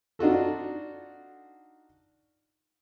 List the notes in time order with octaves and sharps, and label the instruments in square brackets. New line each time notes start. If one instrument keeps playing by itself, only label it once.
[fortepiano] D4 D#4 F4 F#4 A4